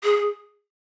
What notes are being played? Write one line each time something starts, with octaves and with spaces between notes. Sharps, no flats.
G#4